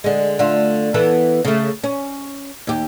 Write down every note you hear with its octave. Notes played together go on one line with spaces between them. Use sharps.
D3 G#3
D3 A3 F4
E3 B3 A4
C#3 A3
C#4
D#2 G4